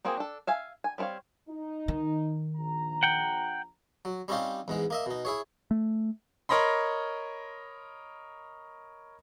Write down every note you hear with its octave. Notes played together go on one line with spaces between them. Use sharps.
A#3 C4 F#4 G#4
D4 A4
E5 F5 G#5
G#5
G3 C4 E4 C#5 F5
D#4
D#3
A#1 A#5
F#5 G5
F#3
G3 C4 C#4 D#4 F4 G4
E2 G#2 G#3
A#3 D#5 E5
B2 D#4
E4 G#4 C#5
A3
A#4 C#5 D#5 B5 C6